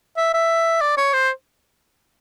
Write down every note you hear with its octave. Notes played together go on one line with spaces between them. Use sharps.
E5
E5
D5
C#5
C5